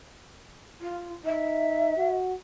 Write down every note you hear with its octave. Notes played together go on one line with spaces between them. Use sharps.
F4
D#4 E5
F#4